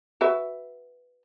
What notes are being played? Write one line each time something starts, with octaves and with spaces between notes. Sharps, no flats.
F#4 B4 E5